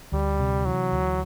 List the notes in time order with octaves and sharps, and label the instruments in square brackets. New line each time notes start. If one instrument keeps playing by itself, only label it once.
[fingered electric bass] D2 [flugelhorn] G3
[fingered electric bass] C3
[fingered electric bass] E3 [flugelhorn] F#3
[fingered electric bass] D2